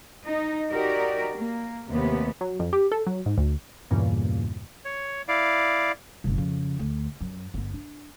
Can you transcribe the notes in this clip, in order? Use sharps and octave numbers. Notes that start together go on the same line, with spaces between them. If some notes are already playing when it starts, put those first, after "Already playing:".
D#4
D#4 F#4 G4 A#4 D5
A#3
D#2 C3 A3 B3
F#3
F2
G4
A4
F#3
G#2
D2
E2 G2 A#2 C#3
C#5
E4 D5 F5
F#1 C2
F2 C#3
D2
F#2
G1 B3
D4